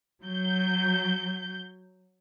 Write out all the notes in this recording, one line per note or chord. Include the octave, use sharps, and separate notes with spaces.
F#3 G6